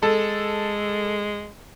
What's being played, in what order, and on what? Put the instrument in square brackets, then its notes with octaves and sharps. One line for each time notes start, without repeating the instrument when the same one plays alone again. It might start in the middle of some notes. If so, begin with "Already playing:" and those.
[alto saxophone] G#3 [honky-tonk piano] A4